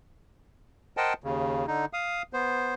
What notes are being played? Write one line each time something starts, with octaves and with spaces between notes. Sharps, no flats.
A#4 C5 D#5 F#5 G5 A5
D#2 C#3
D3 D#4
F5 D#6
B3 C5